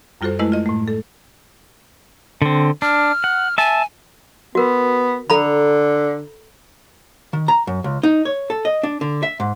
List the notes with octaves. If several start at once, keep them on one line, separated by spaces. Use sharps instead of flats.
F#2 G3 F4 F#4 A4 C5
G#3 A3 E4 B4 D#5
F4 D#5
A2 A3
A4
D3 C4
D4 F6
F#5
E5 G#5 A5
B3 F#4 A#4
D3 A4 A#5 B5
D#3
A#5
F#2
C#2
D#4
C#5
A4
D#5
D4
D3
E5
G#2